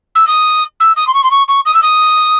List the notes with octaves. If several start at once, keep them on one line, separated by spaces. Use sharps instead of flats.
E6
D#6
E6
D#6
C6
C#6
C6
C#6
C#6
D#6
E6
D#6